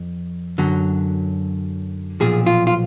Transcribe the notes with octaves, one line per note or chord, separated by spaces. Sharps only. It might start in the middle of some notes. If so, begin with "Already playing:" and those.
Already playing: F2
F#2 D3 F#3
B1 A#2 F3 G#4
F4
F4